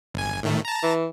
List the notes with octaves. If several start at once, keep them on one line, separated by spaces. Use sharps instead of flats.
G1 G#5
A2 D#3 A3
A5 A#5
E3